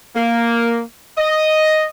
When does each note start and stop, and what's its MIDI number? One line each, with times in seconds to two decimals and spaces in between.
0.15 0.81 58
1.17 1.85 75